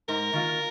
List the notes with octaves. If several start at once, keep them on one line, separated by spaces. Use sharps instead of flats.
G#2 A#4
D#3 A#3 F4